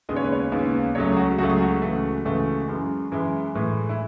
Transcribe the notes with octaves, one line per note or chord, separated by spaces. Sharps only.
D#2 C#3 G#3 B3 D#5
C#5
B4
C#5
D#2 C#3 G#3 B3
C#2 C#3 F#3 A3 C#5
G#4
F#4
C#2 C#3 F#3 A3 F#4
G#4
F#4
C#2 C#3 E3 A3
C#2 C#3 E3 A3 F#4
F#2 E3 G#3
F#2 E3 G#3 E4
A2 E3 G#3
E4